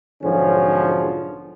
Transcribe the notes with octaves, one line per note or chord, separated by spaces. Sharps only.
B1 G#2 D3 F3 C#4 G#4